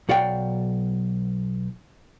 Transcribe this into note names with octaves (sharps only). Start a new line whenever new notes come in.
B1 F#4 D5 F5 G5